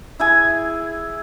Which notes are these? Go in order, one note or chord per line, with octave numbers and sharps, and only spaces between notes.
E4 G#4 G#5